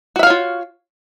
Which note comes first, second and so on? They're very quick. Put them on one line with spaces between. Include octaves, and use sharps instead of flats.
F#4 E5 F5 C#5 F4